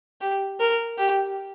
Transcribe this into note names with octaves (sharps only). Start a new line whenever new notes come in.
G4
A#4
G4